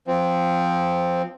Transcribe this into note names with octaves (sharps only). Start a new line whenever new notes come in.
F3 C4